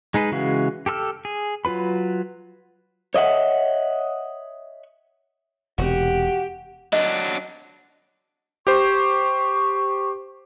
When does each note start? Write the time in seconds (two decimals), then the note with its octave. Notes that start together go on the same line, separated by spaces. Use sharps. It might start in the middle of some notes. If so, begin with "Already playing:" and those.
0.14 G#3 D#4 G#4 B4
0.32 C#3 E3 G#3 F#4 F5
0.86 G4 A4 A#4 E6 F6
1.25 G#4
1.65 F#3 F4 B4 B5
3.14 C#5 D#5 E5 F#5
5.78 E1 C3 F#4 G4
6.93 F#3 D4 D#5
8.67 G4 C5 C#6